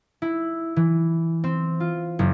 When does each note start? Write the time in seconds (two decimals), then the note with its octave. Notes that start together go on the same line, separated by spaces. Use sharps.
0.22 E4
0.76 E3
1.44 C4
1.80 F4
2.19 F#1